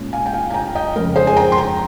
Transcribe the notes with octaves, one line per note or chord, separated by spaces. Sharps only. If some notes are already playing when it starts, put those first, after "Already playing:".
Already playing: A#2 G#3 C#4
F5 G#5
G5
F5 G#5
G#5
G5 A#5
D#5 G5
F2 C#3 G#3 A#4
G#4 C5
G#5
G5 A#5
C6
G5 A#5